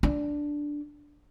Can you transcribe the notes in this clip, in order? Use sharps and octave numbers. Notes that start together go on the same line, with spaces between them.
D4